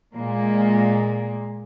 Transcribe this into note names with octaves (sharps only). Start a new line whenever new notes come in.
A#2 G#3 A#3